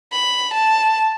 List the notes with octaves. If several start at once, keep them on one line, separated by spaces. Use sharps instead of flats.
B5
A5